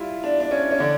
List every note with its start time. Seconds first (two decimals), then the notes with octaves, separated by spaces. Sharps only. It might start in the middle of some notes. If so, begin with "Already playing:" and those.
Already playing: G3 E4 F4
0.24 D4
0.40 D4
0.51 C#4
0.71 C#4
0.79 D3 D4